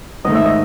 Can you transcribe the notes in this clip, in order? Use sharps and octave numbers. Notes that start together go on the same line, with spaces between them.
G#2 D#3 A3 D#5
E5
D#5